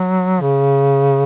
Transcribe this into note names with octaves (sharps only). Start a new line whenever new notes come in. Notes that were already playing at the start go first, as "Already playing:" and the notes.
Already playing: F#3
C#3